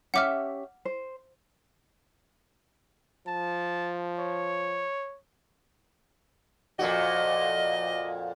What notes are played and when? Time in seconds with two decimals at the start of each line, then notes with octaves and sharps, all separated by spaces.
0.14 C#4 G4 E5 F#5 D6 F6
0.85 C5
3.28 F3 A5
4.19 C#5
6.79 F2 A#2 F#4 D#5